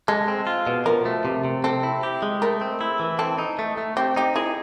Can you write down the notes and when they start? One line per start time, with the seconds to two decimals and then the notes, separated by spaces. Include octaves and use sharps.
0.08 G#3 A4
0.28 C4
0.47 F4
0.67 B2
0.86 F3 A#4
1.05 A3
1.25 C3
1.44 C3
1.64 C4 A4
1.83 E4
2.03 G4
2.22 G#3
2.42 A3 A#4
2.61 C4
2.81 E4
3.00 E3
3.19 C4 A4
3.38 D#4
3.59 A3
3.77 A3
3.97 C4 G4
4.16 D#4 G4
4.36 E4 G#4